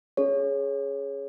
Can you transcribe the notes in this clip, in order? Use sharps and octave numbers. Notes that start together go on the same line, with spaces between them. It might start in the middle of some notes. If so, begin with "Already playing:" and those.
C#4 G#4 C#5